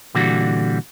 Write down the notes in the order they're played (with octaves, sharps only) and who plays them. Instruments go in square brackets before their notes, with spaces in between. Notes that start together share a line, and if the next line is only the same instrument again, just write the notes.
[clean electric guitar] A#2 D3 E3 G3 F#4